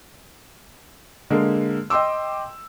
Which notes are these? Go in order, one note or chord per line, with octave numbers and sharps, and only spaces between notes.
D3 G#3 A#3
D#5 G5 C6 D6 E6